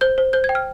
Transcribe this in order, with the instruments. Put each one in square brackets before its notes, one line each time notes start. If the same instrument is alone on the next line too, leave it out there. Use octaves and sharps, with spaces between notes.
[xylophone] C5 G6
C5
C5 G6
G#6
G5
F6